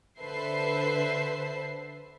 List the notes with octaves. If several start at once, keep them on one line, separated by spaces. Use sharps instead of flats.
D3 A4 B4 C5 E5 C7